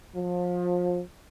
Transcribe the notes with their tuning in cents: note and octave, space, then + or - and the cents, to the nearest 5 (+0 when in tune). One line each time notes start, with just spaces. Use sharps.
F3 +30